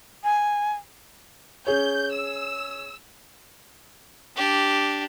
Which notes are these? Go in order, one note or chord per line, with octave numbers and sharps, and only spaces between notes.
G#5
C#4 G#4 C#5 G6
E6
D4 G4